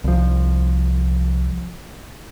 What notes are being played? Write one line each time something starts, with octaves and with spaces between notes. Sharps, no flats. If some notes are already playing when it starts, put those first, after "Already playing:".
C2 F3